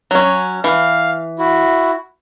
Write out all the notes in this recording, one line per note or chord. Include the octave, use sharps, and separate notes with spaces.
F#3 C#4
E3 F5
E4 F#4